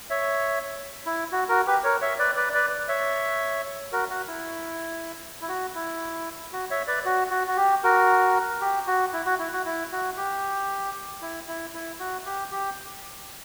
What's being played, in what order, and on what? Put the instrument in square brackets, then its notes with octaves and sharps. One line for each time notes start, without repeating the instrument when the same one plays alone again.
[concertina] C#5 E5
E4
F#4
F#4 A#4
G4 B4
A#4 C#5
C#5 E5
B4 D5
B4 D5
B4 D5
C#5 E5
F#4 A#4
F#4
E4
E4
F#4
E4
F#4
C#5 E5
B4 D5
F#4
F#4
F#4
G4
F#4 A#4
G4
F#4
E4
F#4
E4
F#4
E4
F#4
G4
E4
E4
E4
F#4
G4
G4